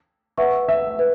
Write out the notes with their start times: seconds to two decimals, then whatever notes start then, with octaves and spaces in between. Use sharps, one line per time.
0.38 B4 E5 F#5 C#6
0.69 E5
0.99 B4